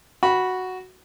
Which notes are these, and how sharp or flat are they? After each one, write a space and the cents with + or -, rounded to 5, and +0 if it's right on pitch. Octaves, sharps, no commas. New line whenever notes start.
F#4 +0 B5 -10